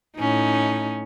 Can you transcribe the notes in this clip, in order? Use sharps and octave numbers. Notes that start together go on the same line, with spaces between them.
A2 C#4 D#4